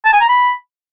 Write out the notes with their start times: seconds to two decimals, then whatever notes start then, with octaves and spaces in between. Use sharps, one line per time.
0.05 A5
0.13 G#5
0.21 A#5
0.29 B5